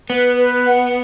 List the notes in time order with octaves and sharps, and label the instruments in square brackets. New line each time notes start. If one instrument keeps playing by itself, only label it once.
[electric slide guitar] B3 [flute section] B4
[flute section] B4
F#5